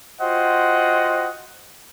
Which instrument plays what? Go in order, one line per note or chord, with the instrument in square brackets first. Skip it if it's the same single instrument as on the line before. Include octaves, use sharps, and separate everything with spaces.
[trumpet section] F4 F#4 C5 D#5 F#5 G5